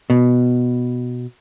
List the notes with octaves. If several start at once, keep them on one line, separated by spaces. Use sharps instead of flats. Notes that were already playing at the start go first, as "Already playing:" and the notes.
B2